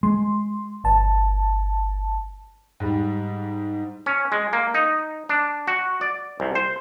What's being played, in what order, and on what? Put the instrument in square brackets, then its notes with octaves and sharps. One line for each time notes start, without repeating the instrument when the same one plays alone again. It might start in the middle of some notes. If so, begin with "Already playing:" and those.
[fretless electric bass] G#3 [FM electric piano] C6
[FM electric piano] G1 A5
[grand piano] G#2 G3
[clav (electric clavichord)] C#4
G#3
A#3
D#4
D4
F#4
D5
C2
C5